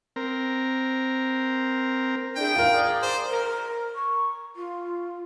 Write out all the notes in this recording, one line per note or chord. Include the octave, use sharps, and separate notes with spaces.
C4 A#4
D4 E4 G#4 G5
D#2 G#2 F4 A#4
G#4 D5
C5
A#4
C#6
F4